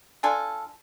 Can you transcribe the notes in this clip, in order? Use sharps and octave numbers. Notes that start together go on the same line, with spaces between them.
D4 F4 A4 G#5